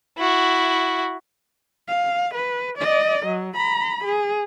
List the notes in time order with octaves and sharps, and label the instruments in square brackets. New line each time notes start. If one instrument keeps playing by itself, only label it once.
[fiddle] E4 F#4
[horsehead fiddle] F5
B4
D5 D#5
F#3
A#5 B5
G#4